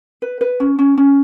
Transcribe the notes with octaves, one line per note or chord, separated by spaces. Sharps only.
B4
B4
C#4
C#4
C#4